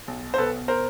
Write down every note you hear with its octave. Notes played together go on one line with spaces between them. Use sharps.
B1
C5
B2 A4 B4
A#4 C5